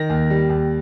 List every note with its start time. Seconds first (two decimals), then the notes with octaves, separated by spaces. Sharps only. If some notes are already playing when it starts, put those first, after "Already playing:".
Already playing: D#3 A#6
0.09 D#2
0.30 G3
0.49 D#2